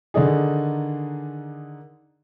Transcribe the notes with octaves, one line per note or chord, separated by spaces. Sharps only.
D3 D#3 D4 D#4 G#4